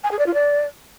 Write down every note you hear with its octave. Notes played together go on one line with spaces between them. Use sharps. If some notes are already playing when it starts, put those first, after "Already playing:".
G#5
G#4
D5
F4
D5